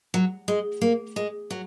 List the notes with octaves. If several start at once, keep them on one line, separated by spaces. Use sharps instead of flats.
F#3
G#3
A#3
G#3
F#3